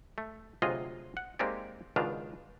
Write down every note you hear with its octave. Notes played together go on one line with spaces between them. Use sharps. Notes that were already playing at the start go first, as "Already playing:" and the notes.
A3
D2 C3 F#3 F4 G#4 D#5
F#5
G#3 A#3 C4 D#4 G4 D5
C#2 B2 D#3 D4 F4 F5